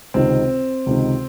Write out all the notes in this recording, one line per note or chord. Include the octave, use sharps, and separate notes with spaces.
C#2 C3 D#3 C4
C#2 C3 D#3